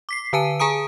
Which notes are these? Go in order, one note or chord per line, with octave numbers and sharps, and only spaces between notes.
D6 B6 C7
D3 B4 G#5 A5 D#7
G#4 G#5 A#5 D#6 D7